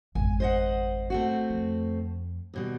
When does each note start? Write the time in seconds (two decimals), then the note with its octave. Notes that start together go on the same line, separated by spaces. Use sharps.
0.15 G#1 F2 G#5
0.40 C5 D#5 F#5
1.10 A3 C4 F#4
1.50 F2
2.54 D#2 B2 G3